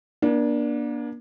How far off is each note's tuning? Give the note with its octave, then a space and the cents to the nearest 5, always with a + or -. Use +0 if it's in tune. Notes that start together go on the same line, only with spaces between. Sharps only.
A#3 +40 D4 +0